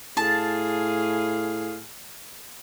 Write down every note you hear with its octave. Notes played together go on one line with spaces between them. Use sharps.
A2 G#4 F5 A5